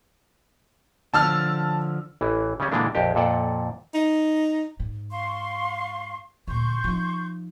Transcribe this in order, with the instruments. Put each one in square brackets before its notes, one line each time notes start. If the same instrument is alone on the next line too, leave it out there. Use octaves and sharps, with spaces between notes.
[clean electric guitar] D3 F3 [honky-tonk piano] A5 E6 F6
[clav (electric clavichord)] A1 E3
C#3 G3 C#4
A#2 D3 E3 G#3 A#3 D4
A#1 F2 G4
F2 A#2 A4 D5 F#5
[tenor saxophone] D#4
[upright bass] G#2
[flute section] F5 C6 C#6
[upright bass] D2 A#2 [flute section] C6 C#6 G6
[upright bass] F3 D#4